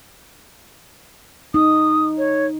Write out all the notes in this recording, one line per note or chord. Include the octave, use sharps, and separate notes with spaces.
D#4 D#6
C#5